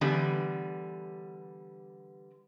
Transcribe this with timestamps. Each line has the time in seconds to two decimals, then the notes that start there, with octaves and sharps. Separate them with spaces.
0.01 D3 E3 G3 B3